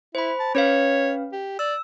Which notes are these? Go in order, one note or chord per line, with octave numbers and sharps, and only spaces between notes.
E4 C5 B5
A5
C#4 B4 C#5 F5
G4
D5 E6